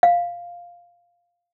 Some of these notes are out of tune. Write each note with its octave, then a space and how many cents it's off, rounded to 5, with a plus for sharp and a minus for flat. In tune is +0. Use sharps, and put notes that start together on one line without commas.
F5 +0